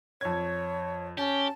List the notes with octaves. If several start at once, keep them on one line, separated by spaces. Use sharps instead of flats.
F2 C#5 G#6
C#4 G4 A5